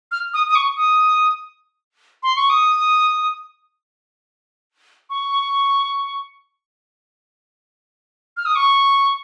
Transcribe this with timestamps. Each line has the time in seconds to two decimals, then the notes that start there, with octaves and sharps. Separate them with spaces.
0.12 F6
0.34 D#6
0.49 D#6
0.55 C#6
0.77 D#6
2.23 C6
2.36 C#6
2.50 D#6
5.10 C#6
8.37 F6
8.45 D#6
8.56 C#6